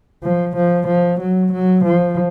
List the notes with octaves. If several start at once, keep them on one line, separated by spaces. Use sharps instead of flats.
F3
F3
F3
F#3
F#3
F3